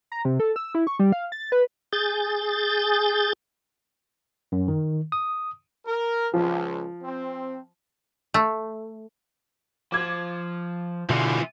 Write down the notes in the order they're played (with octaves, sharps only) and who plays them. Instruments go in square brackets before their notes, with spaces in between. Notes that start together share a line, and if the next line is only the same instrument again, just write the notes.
[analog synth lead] A#5
C3
A4
E6
E4
C#6
G3
F5
A6
B4
[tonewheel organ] G#4 G6 A6
[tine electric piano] F#2
D#3
D#6
[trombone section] A#4
[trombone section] C#2 [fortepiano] F3
[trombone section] C4
[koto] A3
[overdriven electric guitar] F3 [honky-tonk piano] D6 G#6
[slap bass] B2 D3 [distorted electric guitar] E3 F3